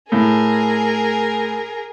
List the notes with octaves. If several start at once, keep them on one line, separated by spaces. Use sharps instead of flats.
A2 G#4 A#4